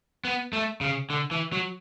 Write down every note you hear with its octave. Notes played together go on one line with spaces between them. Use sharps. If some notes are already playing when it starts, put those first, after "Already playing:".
B3
A3
C#3
D3
E3
F#3